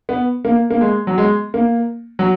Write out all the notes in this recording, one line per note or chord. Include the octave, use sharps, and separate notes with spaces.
B3
A#3
A#3
G#3
F#3
G#3
A#3
F#3